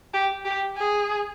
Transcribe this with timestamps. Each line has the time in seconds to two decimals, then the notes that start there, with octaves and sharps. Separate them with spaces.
0.14 G4
0.45 G4
0.77 G#4